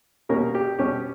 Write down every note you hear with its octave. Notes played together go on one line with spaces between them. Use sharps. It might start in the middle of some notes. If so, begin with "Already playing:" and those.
B2 G3 A#3 C#4 A#4
G4
B2 G3 C#4 G4